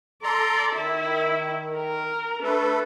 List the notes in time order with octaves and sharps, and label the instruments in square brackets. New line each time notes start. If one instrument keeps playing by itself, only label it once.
[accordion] A4 A#5 C6 [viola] D5
[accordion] D#3 [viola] E4
[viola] A#4
[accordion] A3 A4 B4 [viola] D4